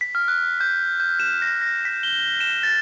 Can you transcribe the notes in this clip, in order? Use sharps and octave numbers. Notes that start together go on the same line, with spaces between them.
B6
F6
F#6
G6
G6
E7
A#6
A#6
B6
G7
E7
A6